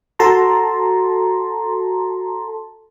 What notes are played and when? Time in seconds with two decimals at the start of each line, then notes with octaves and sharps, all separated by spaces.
0.19 F#4 A4 A5 A#5 C6